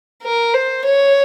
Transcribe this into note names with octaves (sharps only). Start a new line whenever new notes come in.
A#4
C5
C#5